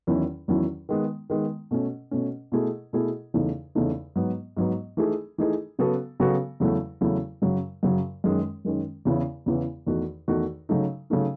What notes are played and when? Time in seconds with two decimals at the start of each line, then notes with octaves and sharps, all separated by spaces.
0.07 E2 D#3 F#3 C#4 E4
0.48 E2 D#3 F#3 C#4 E4
0.89 D#3 G#3 B3
1.30 D#3 G#3 B3
1.71 B2 A3 C#4
2.11 B2 A3 C#4
2.52 B2 A3 E4 G#4
2.93 B2 A3 E4 G#4
3.34 E2 C#3 E3 A3 D#4
3.75 E2 C#3 E3 A3 D#4
4.16 G#2 F#3 B3
4.57 G#2 F#3 B3
4.97 E3 A3 D#4 G#4
5.38 E3 A3 D#4 G#4
5.79 C#3 F#3 B3 F#4 A4
6.20 C#3 F#3 B3 F#4 A4
6.60 E2 C#3 F#3 A3 E4
7.01 E2 C#3 F#3 A3 E4
7.42 F#2 C#3 F#3
7.83 F#2 C#3 F#3
8.24 F#2 D#3 G#3 C#4
8.65 F#2 D#3 G#3 C#4
9.05 E2 C#3 E3 B3 E4
9.46 E2 C#3 E3 B3 E4
9.87 E2 D#3 A3 D#4 F#4
10.28 E2 D#3 A3 D#4 F#4
10.69 C#3 F#3 A3 D#4
11.10 C#3 F#3 A3 D#4